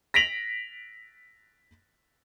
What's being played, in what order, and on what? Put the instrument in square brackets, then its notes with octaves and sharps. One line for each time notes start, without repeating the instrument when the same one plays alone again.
[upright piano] A#6 B6 D7 F7 F#7